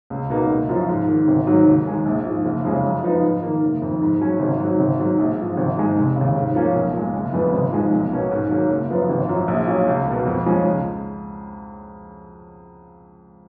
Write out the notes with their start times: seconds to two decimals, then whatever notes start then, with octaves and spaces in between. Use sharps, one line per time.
0.10 C#2
0.30 B2 A#3 D#4
0.50 F#1
0.69 F#2 F3
0.89 G#2
1.08 D#3 A#3
1.28 G#1
1.47 G#2 D#3 F#3
1.67 D#2
1.86 D#3 G#3 D#4
2.06 A#1
2.25 G#2 F3
2.45 F#1
2.65 F2 C#3 G#3
2.84 F#2
3.04 F3 B3 D#4
3.23 G#2
3.43 D#3 A#3
3.62 F#1
3.82 F2 D#3
4.01 G#2
4.20 F#3 C#4
4.40 G#1
4.59 G#2 F#3
4.80 G#1
4.99 G#2 F#3
5.19 A#1
5.38 G#2 F3
5.57 G#1
5.77 G#2 D#3 G#3
5.96 F1
6.16 D#2 C#3
6.36 G#2
6.55 F3 A#3 C#4
6.75 B1
6.94 A#2 G#3
7.14 F#1
7.33 F2 F3 G#3 B3
7.53 G#1
7.73 G#2 F3 G#3
7.92 B1
8.12 B2 A#3 C#4
8.31 G#2
8.51 D#3 F#3 A#3 C#4
8.70 F#1
8.89 F#2 F3 B3
9.09 G#1
9.29 F#2 F3
9.48 A#1
9.68 A#2 F#3 C#4
9.87 C#2
10.07 B2 A#3
10.26 F2
10.46 F3 G#3 C#4
10.65 C#2